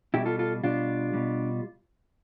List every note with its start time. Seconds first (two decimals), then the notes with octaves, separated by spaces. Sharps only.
0.14 B2 G3 E4 G4
0.26 F4 A4
0.39 F4 A4
0.64 B2 G3 D4 F4
1.13 B2 G3